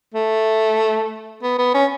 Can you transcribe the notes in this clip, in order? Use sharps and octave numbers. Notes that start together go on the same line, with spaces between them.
A3
B3
B3
C#4